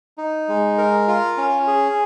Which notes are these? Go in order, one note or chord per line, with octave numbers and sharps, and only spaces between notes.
D#4
G#3
A#4
F4
C#4
G#4